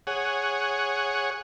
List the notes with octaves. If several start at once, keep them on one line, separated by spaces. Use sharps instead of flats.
G#4 C#5 F#5